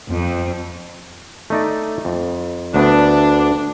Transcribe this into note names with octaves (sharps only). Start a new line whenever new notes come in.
F2
A3 D#4 D5
F2
D2 A3 B3 D4